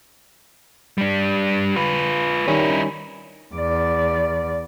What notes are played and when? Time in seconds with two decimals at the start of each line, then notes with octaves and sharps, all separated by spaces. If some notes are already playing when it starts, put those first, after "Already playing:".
0.98 G3 D4
1.76 F4 B4
2.48 D#3 G3 C#4 D#4 E4
3.55 E2 D5